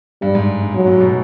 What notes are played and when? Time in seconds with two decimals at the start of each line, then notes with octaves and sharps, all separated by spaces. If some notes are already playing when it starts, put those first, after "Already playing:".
0.22 G2 G3
0.35 G#2
0.61 G2
0.74 G#2 F#3
0.87 A2
1.01 B2